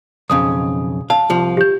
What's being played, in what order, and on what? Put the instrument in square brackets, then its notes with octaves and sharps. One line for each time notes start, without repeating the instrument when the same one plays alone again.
[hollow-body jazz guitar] B1 F2 C#3 [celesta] D#6
[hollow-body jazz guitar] F5 [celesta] A5
[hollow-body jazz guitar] C2 F3
[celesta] G4 G6